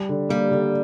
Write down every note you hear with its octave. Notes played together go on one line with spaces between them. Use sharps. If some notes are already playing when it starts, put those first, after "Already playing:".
Already playing: G3
D3
G3 A#3
D3